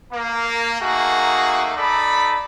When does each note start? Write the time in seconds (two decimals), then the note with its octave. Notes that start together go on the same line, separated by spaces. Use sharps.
0.13 A#3
0.81 A3 A#3 D#4 F#4 G#4
1.76 D#4 A4 D5 B5